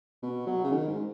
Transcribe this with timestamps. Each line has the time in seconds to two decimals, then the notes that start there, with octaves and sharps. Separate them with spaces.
0.23 B2
0.47 F#3
0.64 C#3
0.71 D#3
0.88 G#2